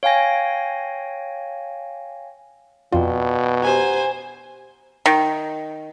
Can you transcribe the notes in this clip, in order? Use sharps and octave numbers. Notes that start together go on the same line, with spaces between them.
C#5 F5 G5 G#5 A#6
F2 B2 F4 D5 F5 G5
G4 C5 F#5 G#5 A#5
D#3